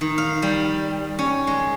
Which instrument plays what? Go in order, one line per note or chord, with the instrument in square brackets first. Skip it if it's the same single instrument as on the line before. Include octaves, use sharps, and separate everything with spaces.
[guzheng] D#3
F5
G3
C#4
G#3